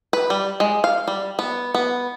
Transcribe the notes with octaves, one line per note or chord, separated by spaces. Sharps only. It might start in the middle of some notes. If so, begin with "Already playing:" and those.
B4
G3
G#3
F5
G3
B3
B3